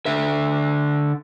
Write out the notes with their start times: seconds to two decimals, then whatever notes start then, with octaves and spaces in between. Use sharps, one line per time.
0.06 D3 E5